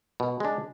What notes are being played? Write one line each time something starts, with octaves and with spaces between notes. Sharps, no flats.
B2
G#3 D4